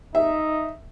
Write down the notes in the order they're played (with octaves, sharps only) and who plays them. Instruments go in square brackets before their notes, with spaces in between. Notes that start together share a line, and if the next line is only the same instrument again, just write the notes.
[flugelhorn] D#4 [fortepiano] E5